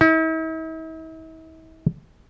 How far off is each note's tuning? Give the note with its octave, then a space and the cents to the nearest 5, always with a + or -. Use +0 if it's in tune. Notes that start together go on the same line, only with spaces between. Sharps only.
E4 -45